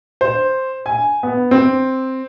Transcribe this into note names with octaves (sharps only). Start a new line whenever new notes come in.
C5
G#5
B3
C4